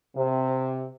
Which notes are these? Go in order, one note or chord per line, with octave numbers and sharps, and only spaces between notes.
C3